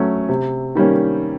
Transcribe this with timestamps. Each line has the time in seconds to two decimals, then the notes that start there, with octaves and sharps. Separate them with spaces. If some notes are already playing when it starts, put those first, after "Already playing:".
Already playing: F#3 A3 C#4
0.29 C3
0.75 D#3 G3 A#3 C#4